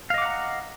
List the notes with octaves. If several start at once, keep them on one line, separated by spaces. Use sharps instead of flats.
D#5 F5 F#5 A#5 D6